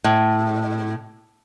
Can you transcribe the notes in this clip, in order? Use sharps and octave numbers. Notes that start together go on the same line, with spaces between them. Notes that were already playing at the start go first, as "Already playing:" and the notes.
A2